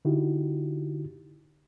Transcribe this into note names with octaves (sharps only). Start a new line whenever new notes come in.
D3 D#4 E4 F#4 G4